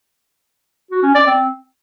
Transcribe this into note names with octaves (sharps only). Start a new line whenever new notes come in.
F#4
C#4
D5
C4